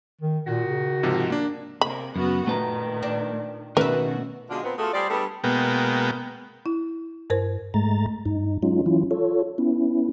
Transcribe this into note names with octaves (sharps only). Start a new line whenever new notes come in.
D#3
A#2 D#3 F#4
C#3
G#2 C3 F3
A#3 D4
C3 A#3 B5
F#2 C#3 B3 F#4
A#2 D#3 A3 B4 A#5
D4
B2 D#3 A3 C#4 F#4 A#4 B4 E5
B2 D3 G#3 D4 F4
A#2 B3 C4
A3 B3 F4 F#4 G#4 A4
G3 G#4 C5 D5
G3 A3 B3 D4 G#4 A4
B2 G#3 A#3 B3 G5
E4
G2 A#4 C5
G#2 G#3 A3 A#5 A6
G2 D#4
F#3 G#3 C#4 D#4 F4
E3 F#3 C#4 E4 F4
F4 A4 C#5
B3 C#4 E4